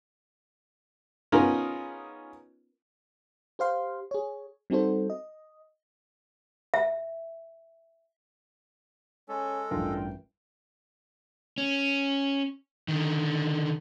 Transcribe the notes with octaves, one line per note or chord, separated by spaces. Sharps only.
B3 C#4 D#4 F4 G#4 A#4
G4 C5 F5 C6
G#4 C#5
G3 C4 D#4 F#4 A4 C5
D#5
E5
G#3 C#4 A4
A1 G2 D4 F4 A#4 G5
C#4
D3 D#3